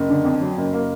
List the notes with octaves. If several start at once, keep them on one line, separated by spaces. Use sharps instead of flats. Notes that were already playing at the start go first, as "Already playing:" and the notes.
Already playing: F#1
D3
F2
F#3
F#1
A#3